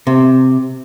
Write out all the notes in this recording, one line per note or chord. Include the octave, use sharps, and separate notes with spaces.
C3